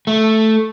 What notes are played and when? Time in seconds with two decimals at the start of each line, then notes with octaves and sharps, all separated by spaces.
0.07 A3